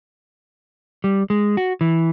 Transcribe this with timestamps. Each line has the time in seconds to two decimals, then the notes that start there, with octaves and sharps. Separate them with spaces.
1.04 G3
1.30 G#3
1.57 F#4
1.81 E3